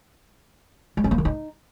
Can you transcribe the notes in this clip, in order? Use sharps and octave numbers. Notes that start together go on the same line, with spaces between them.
G#3
C#4
A#3
D#3
D#4